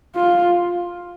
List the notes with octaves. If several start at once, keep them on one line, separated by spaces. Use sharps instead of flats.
F4